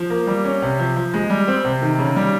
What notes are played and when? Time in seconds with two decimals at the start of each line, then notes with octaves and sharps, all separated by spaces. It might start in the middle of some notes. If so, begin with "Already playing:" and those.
Already playing: F3
0.10 A#3
0.27 G3
0.45 C#4
0.62 C3
0.79 F3
0.96 F3
1.14 G#3
1.30 G3
1.48 C4
1.64 C3
1.82 D#3
1.99 C#3
2.16 G3